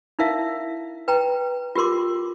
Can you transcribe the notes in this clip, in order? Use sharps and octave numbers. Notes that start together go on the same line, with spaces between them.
D#4 E4 A#4 E5 F5
B4 G5 A#5
F4 G4 A#4 C6 D6